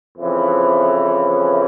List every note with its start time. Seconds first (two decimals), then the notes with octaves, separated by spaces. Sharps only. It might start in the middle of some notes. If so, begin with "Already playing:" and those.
0.19 F2 C#3 E3